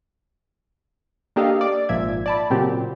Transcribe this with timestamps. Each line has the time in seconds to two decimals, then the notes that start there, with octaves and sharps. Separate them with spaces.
1.36 A#3 D4 G4 A4 D#5 F5
1.61 D5
1.89 G#1 A#2 F3 E5 G#6
2.26 D5 A5 B5
2.50 A#2 C#3 F#3 C4 G4